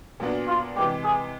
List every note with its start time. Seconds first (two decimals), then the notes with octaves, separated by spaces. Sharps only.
0.20 A#2 F#3 B3 D4
0.47 F4
0.76 C3 E3 G#3 G4
1.04 G#4